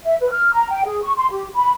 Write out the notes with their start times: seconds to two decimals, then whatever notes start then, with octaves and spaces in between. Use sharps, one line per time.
0.04 E5
0.19 B4
0.31 F6
0.53 A#5
0.70 G5
0.85 G#4
1.02 C#6
1.16 C6
1.31 G4
1.55 B5